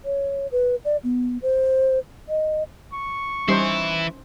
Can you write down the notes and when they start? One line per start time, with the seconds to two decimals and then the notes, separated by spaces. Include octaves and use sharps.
0.05 C#5
0.52 B4
0.85 D5
1.04 B3
1.42 C5
2.29 D#5
2.94 C#6
3.48 E3 G3 C#4 D#4 E4 C5 C7